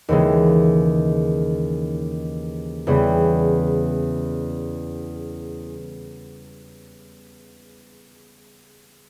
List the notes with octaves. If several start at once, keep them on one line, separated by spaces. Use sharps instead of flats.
D#2 C#3 E3 G#3
E2 C#3 E3 G3 B3